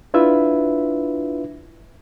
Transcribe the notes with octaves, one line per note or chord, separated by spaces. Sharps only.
D4 E4 F4 B4 E5